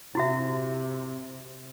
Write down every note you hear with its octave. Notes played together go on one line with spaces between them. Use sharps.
C3 E4 F#4 E5